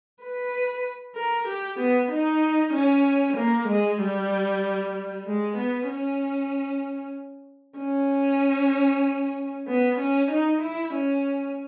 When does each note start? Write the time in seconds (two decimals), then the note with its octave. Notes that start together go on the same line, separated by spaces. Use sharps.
0.22 B4
1.16 A#4
1.48 G4
1.79 B3
2.11 D#4
2.73 C#4
3.37 A#3
3.68 G#3
4.01 G3
5.27 G#3
5.57 B3
5.89 C#4
7.79 C#4
9.68 B3
9.99 C#4
10.31 D#4
10.62 E4
10.93 C#4